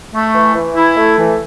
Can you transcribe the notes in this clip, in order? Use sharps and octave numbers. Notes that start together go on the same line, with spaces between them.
A3
E3
E3
E4
A3
E3